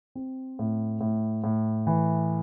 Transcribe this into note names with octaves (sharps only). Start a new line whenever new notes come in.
C4
A2
A2
A2
E3